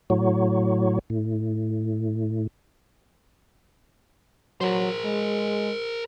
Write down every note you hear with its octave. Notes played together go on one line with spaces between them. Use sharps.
A2 F#3
A2
F#3 A#4 C5
G#3